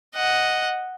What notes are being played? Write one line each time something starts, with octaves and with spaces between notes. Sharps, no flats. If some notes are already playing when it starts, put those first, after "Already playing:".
D#5 F#5